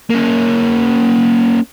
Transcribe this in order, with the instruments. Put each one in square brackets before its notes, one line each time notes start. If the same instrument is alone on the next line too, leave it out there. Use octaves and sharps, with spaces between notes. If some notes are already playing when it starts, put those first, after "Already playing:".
[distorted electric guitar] A#3 C#4